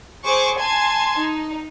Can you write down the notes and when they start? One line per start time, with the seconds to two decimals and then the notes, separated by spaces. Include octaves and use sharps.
0.25 G#4 C5 C#6 D6
0.58 G#5 A5 C6 G#6
1.17 D#4